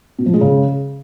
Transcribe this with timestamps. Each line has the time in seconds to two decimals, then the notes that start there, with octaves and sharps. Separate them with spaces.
0.19 B2
0.26 F3
0.34 G#3
0.41 C#3